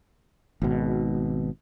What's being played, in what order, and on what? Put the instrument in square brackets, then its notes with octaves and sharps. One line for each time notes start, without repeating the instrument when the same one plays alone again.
[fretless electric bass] G#1 B2